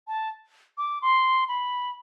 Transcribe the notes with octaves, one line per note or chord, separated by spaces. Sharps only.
A5
D6
C6
B5